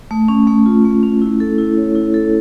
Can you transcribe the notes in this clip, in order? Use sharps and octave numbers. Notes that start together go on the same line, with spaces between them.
A3
C#4
A3
F4
A3
C#4
E4
A4
E4
C#5
E4
A4